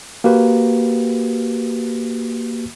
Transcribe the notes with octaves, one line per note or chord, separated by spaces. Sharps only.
A#3 F#4 G4 B4